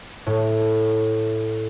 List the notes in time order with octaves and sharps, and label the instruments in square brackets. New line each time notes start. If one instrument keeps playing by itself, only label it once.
[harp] A2